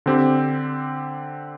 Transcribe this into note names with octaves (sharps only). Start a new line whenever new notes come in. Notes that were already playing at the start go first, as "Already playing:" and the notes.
D3 C4 G4